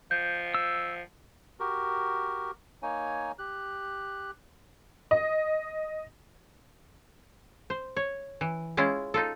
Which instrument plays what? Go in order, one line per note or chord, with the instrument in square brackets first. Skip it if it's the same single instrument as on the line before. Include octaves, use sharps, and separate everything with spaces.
[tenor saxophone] F3 [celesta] G6
[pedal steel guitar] E6
[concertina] F#4 G4 A#4
A#3 D#4 C#5 G#5
G4 F#6
[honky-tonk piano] D#5
[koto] C5
C#5
E3
G#3 C#4 E4 F4
D#4 F4 A4